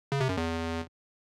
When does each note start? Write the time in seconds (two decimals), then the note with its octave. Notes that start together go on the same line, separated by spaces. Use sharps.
0.12 C#3
0.20 C3
0.29 F#2
0.37 E2